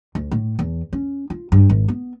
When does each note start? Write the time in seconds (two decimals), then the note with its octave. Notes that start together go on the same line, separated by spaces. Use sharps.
0.15 D2
0.31 A2
0.59 E2
0.93 C#4
1.30 F4
1.52 G2
1.69 G#1
1.88 B3